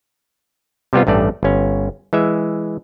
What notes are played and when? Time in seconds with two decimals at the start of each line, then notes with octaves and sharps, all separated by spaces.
0.93 C3 G3 B3 F4
1.07 A1 G2 A3 D5
1.43 G1 C#4
2.13 E3 G#3 E5